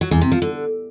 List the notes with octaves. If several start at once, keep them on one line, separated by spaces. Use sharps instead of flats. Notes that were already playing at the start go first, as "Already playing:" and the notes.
F#3
E2
C3
F3
D3